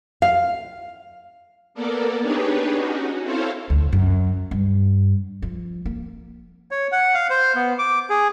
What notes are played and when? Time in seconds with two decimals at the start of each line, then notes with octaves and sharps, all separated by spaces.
0.22 F5
1.74 A#3 B3 A4 A#4 D5
2.21 D4 D#4 G4 G#4 B4 C#5
2.74 C#4 D#4 F#4
3.22 C4 E4 A4 C5 C#5 F5
3.70 D2
3.93 F#2
4.51 G2
5.42 F3
5.85 A#3
6.71 C#5
6.92 F#5
7.14 F5
7.30 C5
7.55 B3
7.79 D6
8.10 G#4